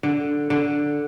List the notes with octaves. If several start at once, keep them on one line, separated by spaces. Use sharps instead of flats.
D3
D3